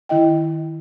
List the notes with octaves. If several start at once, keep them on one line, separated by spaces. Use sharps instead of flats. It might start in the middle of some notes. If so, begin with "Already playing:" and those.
D#3 E4 D#5 G5